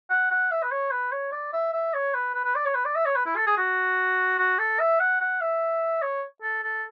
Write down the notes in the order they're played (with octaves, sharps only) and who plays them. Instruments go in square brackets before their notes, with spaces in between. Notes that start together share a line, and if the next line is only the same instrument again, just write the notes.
[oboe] F#5
F#5
E5
B4
C#5
B4
C#5
D5
E5
E5
C#5
B4
B4
B4
D5
C#5
B4
D5
E5
C#5
B4
E4
A4
G#4
F#4
F#4
A4
E5
F#5
F#5
E5
C#5
A4
A4